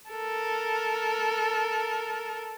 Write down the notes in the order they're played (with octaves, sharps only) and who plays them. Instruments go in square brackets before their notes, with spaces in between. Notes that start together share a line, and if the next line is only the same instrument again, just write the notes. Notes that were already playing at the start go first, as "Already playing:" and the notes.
[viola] A4 A#4